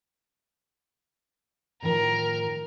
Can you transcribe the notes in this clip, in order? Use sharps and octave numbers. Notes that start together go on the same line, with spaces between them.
A2 D#3 F3 A#4